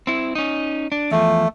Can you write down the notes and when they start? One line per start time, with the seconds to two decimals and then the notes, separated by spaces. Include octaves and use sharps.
0.07 C4 E4
0.35 C#4 D#4
0.92 D4
1.11 E2 F3 A3